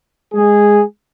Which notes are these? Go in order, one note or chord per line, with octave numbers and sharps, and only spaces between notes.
G#3 G#4